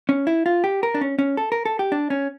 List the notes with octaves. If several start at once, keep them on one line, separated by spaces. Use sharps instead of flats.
C#4
E4
F4
G4
A#4
D4
C#4
C#4
A4
A#4
A4
G4
D4
C#4